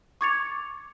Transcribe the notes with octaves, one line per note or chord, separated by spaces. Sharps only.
C#6 D6 G#6 A6 C#7 F7